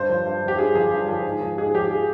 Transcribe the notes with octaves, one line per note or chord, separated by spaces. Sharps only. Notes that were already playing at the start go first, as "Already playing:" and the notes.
Already playing: G2 C5
F3
G2
F3
G4
G2 G#4
F3 G#4
G2
F3
G#2
F3
G#2 G#4
F3 G4
G#4